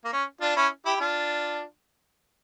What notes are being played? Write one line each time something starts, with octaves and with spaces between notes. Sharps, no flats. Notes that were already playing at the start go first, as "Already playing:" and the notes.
A#3
C#4
D4 F4
C#4 E4
E4 G4
E4
D4 F4